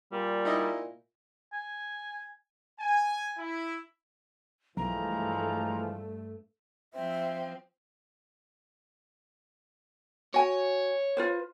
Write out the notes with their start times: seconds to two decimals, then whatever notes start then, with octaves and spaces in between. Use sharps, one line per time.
0.12 A#2 G3
0.45 D#4 E4 D#5
1.53 G#5
2.80 G#5
3.39 E4
4.77 B1 G2 E3 F3 G#3 A3 A#5
6.94 F3 C4 E5
10.34 F#4 C#5 G#5
11.17 F4 B4 C5